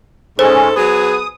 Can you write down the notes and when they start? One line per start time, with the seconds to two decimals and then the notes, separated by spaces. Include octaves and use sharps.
0.39 G#2 G#3 C#4 A4 C5
0.76 F#3 B3 G#4 D#6